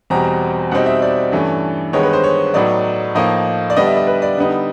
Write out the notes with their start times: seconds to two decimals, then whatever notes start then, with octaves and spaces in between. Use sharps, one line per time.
0.10 E2 B2 G3 C4 A#5
0.71 B2 G3 C4 D#4 F#5
0.86 E5
1.02 D5
1.32 G2 E3 A3 C#4
1.93 G2 D#3 G#3 B3 D#4 C#5
2.03 B4
2.13 C5
2.24 C#5
2.54 A2 F#3 B3 D#4 D5
3.15 A2 F3 A#3 D#4 D#5
3.70 D5
3.76 D3 G3 B3 D4 D#5
3.87 E5
3.97 D#5
4.07 B4
4.22 D5
4.37 D3 G3 B3 D#4